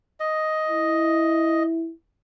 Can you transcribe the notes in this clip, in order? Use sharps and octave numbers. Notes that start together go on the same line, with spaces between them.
D#5
E4